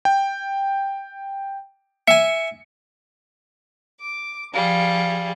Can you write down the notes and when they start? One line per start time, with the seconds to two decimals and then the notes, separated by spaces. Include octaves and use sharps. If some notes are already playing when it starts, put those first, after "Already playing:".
0.05 G5
2.08 E5 G#5 C#7
4.00 D6
4.54 F3 G3 G#4 F5